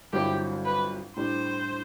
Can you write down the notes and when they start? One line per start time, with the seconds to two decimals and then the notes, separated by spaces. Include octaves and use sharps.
0.13 G1 G2 F#3 C4 E4 G4
0.65 B4
1.17 A2 G3 D4 C5